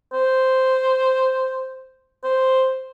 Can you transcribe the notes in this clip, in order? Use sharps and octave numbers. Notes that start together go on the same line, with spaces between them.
C5
C5